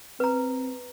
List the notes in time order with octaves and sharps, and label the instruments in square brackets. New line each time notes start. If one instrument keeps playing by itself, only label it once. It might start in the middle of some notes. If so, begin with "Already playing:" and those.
[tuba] C4 [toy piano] B4 A#5